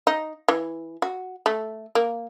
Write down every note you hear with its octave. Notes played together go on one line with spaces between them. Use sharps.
D#4
E3
F#4
A3
A#3